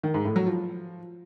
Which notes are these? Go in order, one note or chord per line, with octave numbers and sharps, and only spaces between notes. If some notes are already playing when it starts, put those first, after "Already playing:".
D#3
G#2
A2
F#3
F3